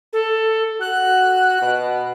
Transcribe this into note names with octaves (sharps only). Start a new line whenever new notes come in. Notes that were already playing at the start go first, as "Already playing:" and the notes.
A4
F#4 F#6
B2